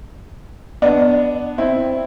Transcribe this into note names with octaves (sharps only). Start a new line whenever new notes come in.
B3 D4
C4 E4